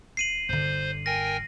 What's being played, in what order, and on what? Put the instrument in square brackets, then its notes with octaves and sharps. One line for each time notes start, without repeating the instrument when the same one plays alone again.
[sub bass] E1 [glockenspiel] C7 D#7 F#7
[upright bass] G2 D3 [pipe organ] C5
[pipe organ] A#4 G5 G#5 [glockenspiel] A#6